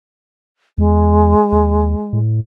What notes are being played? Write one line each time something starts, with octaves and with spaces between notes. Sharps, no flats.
E2 G#3
D#2
A2